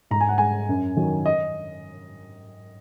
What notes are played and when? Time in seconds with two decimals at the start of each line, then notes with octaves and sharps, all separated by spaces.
0.11 G#2 A#5
0.21 G#5
0.29 F#5
0.38 G#3 G#5
0.69 F#2
0.96 D#3 F#3
1.26 D#5